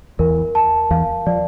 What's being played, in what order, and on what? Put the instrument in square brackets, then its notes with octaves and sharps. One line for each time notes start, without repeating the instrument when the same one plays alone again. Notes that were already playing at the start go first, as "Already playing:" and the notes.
[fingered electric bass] E2 E3 [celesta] A#4
[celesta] A5
[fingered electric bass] E2 E3 [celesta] F5
[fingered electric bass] F3 [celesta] D5